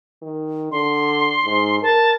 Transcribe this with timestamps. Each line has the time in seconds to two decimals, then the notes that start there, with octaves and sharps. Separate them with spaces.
0.22 D#3
0.72 D3 C6
1.46 G#2
1.83 A#4 A5